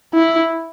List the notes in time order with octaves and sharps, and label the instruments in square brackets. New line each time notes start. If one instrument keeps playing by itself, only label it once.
[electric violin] E4